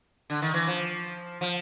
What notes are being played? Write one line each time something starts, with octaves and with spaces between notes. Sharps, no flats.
D3
D#3
E3
F3
F3